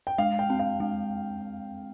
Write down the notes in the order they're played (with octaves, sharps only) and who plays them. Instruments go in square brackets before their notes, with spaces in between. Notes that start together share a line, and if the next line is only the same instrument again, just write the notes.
[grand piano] G5
[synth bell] G#3 [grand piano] F5
[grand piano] G5
[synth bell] C4
[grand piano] F5
[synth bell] G#3